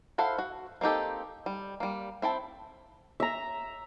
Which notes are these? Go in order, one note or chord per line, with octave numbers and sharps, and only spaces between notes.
E4 A4 C5 F5 F#5
F#4
A#3 C4 D#4 G4 A4
G3
G3 A#3
C4 E4 G5 A5
E5 A#5